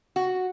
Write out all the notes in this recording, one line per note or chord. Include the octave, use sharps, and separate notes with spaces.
F#4